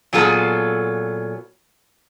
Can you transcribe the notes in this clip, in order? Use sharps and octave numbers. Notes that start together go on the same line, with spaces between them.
A#2 F#3 B3 F4 G#4 A4